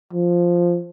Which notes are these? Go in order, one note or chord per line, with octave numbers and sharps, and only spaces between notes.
F3